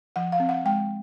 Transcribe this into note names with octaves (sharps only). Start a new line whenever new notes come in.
F3 F#5
F5
C4
F#5
G#3 G5